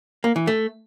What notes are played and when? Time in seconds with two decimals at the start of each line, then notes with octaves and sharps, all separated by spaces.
0.24 A#3
0.36 E3
0.47 A3